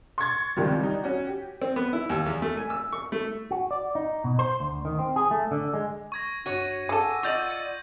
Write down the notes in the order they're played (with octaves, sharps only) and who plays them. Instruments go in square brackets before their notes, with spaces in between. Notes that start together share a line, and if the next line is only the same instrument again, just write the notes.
[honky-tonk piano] C6 C#6 G#6 A6
C#2 C3 D#3 F3 G3
G3 D#4
C#4 F#4
G4
[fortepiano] C4
B3
E4
D#2
E2
A3
G#5
E6
C#6
A3
[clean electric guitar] F#4
D5
D#4
B2
C5
D2
D#3
C4
G#4
A3
D3
G#3
[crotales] C#6 G#6 A#6
[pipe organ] G2 [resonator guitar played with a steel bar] F#4 C#5 [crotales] C#6 D#7
[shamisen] G#4 A4 [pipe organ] F#5 D6 E6
[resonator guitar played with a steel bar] F4 D5 D#5 [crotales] C#6 G6 F#7